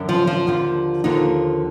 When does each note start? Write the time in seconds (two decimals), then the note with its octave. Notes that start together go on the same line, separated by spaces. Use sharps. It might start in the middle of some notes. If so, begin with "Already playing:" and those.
Already playing: F#2 D3
0.09 F3
0.27 F3
0.47 D#2 D3 F3
1.04 D#2 D3 F3 D#4